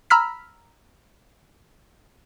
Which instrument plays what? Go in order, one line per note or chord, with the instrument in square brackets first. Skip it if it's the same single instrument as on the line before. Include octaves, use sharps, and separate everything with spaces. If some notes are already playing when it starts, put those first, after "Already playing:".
[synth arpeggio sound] A#5 B5 E6 F6 B6